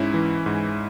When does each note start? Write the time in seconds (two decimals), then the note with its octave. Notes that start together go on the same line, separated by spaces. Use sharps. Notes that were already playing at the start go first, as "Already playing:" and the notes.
Already playing: G#2 C#4 E4
0.14 E3
0.46 G#2